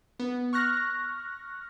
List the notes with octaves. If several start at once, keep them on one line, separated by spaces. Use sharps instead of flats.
B3
C#6 F6 F#6 A#6